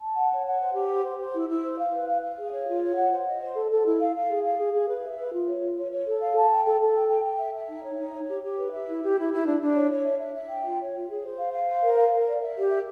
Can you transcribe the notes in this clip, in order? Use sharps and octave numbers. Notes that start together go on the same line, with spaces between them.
A5
F#5
C#5
F#5
C5
G4
C5
C5
C5
E4
E4
C5
F5
B4
F5
F5
G#4
C#5
F4
C#5
F#5
C5
D#5
C5
A4
A4
E4
F5
F5
G#4
F5
G#4
G#4
B4
E5
B4
F4
C#5
F4
C#5
C#5
A4
F5
A5
G5
A4
A4
G5
G5
G5
E5
E5
D#4
C#5
D#4
C#5
G4
G4
B4
E5
E4
G4
E4
E4
D4
D4
C#5
C#5
E5
E5
E5
G5
F4
C#5
F4
G#4
C5
F5
F5
C5
A#4
F5
A#4
D5
E5
G4
E5